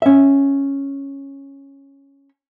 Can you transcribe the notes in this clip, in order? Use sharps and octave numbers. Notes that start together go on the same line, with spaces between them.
C#4 E5